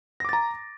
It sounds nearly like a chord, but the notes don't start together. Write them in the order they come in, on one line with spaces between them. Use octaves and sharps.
A#6 D6 A6 A#5